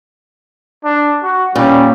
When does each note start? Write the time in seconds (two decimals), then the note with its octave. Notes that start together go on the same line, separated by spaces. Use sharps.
0.84 D4
1.23 F#4
1.56 A#2 G3 C#4